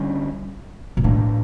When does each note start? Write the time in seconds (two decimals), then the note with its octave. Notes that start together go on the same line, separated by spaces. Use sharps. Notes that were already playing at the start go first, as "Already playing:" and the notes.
Already playing: D3 G3 C#4
0.97 A#2
1.04 A2 E3 A#3 D4